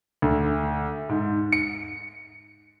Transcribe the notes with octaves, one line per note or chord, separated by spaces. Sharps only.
D2
G#2
C#7